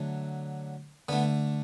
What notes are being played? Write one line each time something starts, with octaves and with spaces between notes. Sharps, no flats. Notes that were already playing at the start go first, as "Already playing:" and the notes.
Already playing: D3 F#3 A3
D3 A3 B3